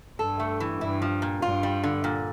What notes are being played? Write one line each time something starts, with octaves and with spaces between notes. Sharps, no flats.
G2 A4
A3
E3
G2 E4
F3
A#2
G2 F4
G3
D3
A#2